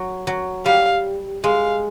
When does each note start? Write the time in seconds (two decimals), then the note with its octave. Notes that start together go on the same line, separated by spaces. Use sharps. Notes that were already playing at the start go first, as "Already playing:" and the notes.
Already playing: F#3
0.27 F#3
0.66 G3 F5
1.44 G#3 F5